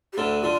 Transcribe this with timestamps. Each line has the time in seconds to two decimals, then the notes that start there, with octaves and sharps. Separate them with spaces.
0.13 G4
0.17 D2 D3 A4
0.43 D3 F4